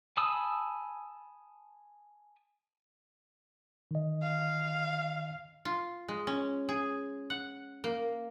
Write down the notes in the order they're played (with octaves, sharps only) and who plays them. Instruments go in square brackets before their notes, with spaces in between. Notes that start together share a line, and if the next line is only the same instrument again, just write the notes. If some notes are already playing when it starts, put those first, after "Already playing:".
[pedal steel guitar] G#5 A5 B5 D#6 E6
[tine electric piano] D#3 D#5
[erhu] F5
[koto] F4
G#3
C#4
G#4
F#5
A#3